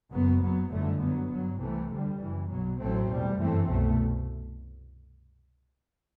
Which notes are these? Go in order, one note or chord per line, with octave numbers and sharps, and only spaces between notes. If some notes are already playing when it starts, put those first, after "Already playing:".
F#1 F#2 F#3 B3
F#2 F#3 B3
G1 F#2 D3 F#3 A3
F#2 F#3 B3
G1 G2 F#3
C2 C3 E3 A3
D2 D3 G3
F#1 F#2 E3
B1 B2 F#3
A1 A2 F#3 A3 C4
E2 B2 G3
G1 F#2 E3 A3 C4
C2 B2 A3